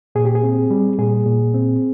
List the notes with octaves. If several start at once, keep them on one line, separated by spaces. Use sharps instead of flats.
A#2 G#4
G4
G#4
C4
G3
A#2 G#4
A#2
C4